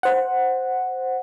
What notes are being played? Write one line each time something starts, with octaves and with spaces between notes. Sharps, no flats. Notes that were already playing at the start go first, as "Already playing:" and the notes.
C5 F#5